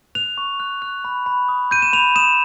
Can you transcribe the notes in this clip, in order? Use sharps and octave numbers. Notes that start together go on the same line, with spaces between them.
F#6 F7
C#6
F#6
F#6
B5
B5
D#6
G6 D#7
E7
B5 F7
D#6 E7